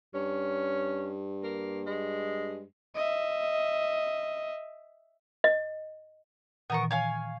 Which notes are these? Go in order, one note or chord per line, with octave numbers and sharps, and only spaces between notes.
G2 C#4
A#3
G#3
D#5 E5
D#5
A#2 D#3 E3 B3 A#4 C#6
C#5 F5 G#5